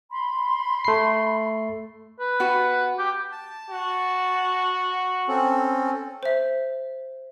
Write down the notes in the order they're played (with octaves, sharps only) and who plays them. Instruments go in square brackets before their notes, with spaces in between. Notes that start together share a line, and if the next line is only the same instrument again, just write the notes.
[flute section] B5 C6
[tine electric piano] A3 C7
[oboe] B4
[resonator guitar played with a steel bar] B3 F#4
[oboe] G4
[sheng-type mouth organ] A5
[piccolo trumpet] F#4
[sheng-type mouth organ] C4 C#4 A4
[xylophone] C5 E5